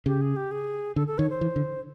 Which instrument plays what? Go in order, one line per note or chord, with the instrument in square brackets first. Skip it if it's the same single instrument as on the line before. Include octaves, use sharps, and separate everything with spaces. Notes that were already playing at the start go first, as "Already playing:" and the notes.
[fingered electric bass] C#3 [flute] G4
[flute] G#4
G4
G#4
[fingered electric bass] D3 [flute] A4
[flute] A4
[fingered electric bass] D#3 [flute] C#5
[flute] C5
[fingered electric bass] E3
D3